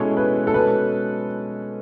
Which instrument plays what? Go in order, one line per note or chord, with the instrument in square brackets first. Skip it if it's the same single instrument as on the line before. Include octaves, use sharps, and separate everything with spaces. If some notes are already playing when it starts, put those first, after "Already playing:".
Already playing: [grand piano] B2 G#3 C#4 E4 G#4 [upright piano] A4
[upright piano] B4
A4
[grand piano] B2 G#3 C#4 [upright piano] B4